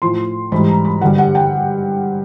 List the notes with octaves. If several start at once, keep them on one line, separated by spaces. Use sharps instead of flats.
A2 F3 C6
G#2 E3 G3 B5
A#5
B5
G2 D3 G3 F#5
F#5
G5